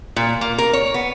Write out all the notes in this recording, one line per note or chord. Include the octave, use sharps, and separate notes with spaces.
A#2
A#3
A#4
C#5
B3